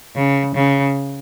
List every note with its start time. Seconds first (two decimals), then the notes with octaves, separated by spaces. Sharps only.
0.15 C#3
0.55 C#3